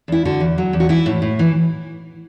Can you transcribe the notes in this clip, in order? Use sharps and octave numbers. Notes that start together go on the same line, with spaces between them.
E2 E4
D3 F#4
E2
F#3
E2
F#4
E3 E4
A2
A2
E3